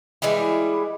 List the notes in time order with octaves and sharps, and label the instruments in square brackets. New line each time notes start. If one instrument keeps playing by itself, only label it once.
[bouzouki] E3 G3 G#3 E4